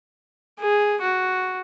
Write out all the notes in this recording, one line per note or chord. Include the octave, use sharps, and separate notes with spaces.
G#4
F#4